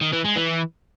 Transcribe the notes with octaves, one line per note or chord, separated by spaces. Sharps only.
D#3
E3
G#3
E3